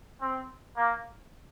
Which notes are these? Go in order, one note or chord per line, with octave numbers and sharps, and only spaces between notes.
C4
A#3